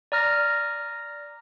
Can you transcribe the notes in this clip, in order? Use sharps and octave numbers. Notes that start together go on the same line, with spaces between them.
D5 A#5 F6 A#6